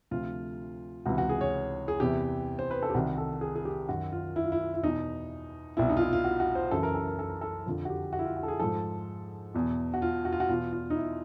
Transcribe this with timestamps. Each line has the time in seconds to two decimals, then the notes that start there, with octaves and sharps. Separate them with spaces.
0.11 D2 C3 F3 F4
1.06 C#2 C3 E3 F#4
1.18 F#4
1.29 G#4
1.41 C#5
1.88 G#4
2.00 E2 C3 E3 G4
2.59 C5
2.71 B4
2.83 A4
2.90 G4
2.94 C2 C3 D#3 F#4
3.18 A4
3.41 G#4
3.56 G#4
3.65 G4
3.89 F#2 D#3 F#4
4.12 F4
4.36 E4
4.44 F4
4.52 E4
4.74 E4
4.83 E2 B2 D#4
5.77 C2 B2 E4
5.89 D#4
5.97 F4
6.01 E4
6.13 F4
6.24 F#4
6.40 F#4
6.55 C5
6.71 F#2 C#3 E3 A4
6.83 A#4
6.95 A4
7.07 A#4
7.19 A4
7.30 A#4
7.41 A4
7.66 F2 D3 F3
7.85 F#4
7.89 G4
8.13 F#4
8.19 E4
8.25 F4
8.37 F#4
8.43 A4
8.48 G#4
8.60 G#2 F3 A4
9.54 E2 B2
9.94 F#4
10.02 F4
10.25 F#4
10.32 F4
10.40 F#4
10.49 E2 B2 F4
10.72 F4
10.90 D#4
10.96 E4